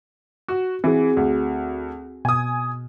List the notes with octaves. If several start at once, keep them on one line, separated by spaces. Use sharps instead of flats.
F#4
E3 C4 F#4 G#4
D2
B2 G#5 D#6